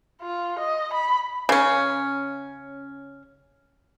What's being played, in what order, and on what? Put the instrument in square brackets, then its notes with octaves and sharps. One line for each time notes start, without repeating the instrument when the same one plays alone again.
[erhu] F4
D#5
B5
[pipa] C#3 C#4